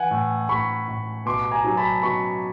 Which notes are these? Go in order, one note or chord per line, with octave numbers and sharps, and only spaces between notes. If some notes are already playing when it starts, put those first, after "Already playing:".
Already playing: E3 F#5 G#5
A2
A2 B5 C#6
A2
B2 C6 D6
G#5 A#5
F#3
A5 B5
B2 B5 C#6